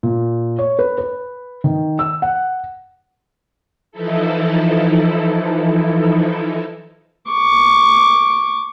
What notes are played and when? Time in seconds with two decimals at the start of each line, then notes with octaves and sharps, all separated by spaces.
0.03 A#2
0.59 C#5
0.79 B4
0.98 B4
1.64 D#3
1.99 E6
2.22 F#5
3.92 E3 F3 D#4 E4 A4
7.31 C#6 D6